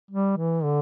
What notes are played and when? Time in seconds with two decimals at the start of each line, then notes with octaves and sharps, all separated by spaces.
0.10 G3
0.38 E3
0.64 D3